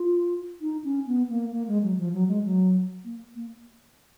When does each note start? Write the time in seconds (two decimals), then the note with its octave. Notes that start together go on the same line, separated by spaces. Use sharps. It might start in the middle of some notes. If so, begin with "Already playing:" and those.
Already playing: F4
0.61 D#4
0.84 C#4
1.07 B3
1.30 A#3
1.53 A#3
1.68 G#3
1.83 F#3
1.98 F3
2.13 F#3
2.28 G#3
2.44 F#3
3.05 A#3
3.35 A#3